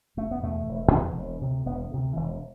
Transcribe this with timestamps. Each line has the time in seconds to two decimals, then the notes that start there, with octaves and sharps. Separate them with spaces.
0.17 E1 A3
0.31 B3
0.42 E2 B2 A3
0.68 E1
0.92 E2 B2
1.17 E1
1.41 D2 C3
1.65 E1 B3
1.91 D2 C3
2.16 E1 E3